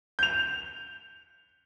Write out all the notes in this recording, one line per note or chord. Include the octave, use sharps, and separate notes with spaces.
G6 F7